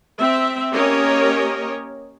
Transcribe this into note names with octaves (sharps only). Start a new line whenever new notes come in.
C4 E5
A#3 C#4 G4 A#4 C#5 D#5